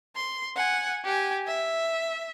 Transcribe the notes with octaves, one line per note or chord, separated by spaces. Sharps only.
C6
F#5 G#5
G4 G#5
E5